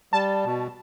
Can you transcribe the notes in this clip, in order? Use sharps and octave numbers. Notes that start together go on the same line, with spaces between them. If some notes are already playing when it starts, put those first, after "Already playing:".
G3 A5
B2